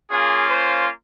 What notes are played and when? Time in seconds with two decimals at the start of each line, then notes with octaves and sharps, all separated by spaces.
0.11 A#3 C#4 F4 G#4
0.50 C5